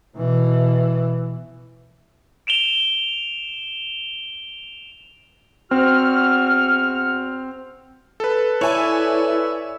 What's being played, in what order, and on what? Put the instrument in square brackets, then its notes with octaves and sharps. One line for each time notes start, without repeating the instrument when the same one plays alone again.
[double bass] B2 E3
[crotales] D7 E7 F7 G7
[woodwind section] E2 F#4 F6 [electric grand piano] C4
[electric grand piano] A4 B4
[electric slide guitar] E4 [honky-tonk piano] C#5 G#5 [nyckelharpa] D5 E5